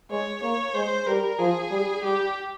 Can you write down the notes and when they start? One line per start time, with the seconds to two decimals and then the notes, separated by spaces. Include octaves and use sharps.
0.11 G#3 C#5
0.42 A#3 C#5
0.74 G#3 C5
1.06 G3 A#4
1.39 F3 G#4
1.71 G3
2.03 G3 G4